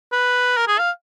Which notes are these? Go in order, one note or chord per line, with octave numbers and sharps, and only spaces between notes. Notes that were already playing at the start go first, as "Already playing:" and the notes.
B4
A#4
G#4
F5